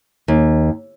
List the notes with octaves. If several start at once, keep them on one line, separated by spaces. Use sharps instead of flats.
D#2